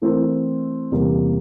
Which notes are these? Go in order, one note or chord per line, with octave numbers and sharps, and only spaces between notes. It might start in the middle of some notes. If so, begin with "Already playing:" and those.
E3 A3 C4 E4 A#4
E2 C3 G3 A#3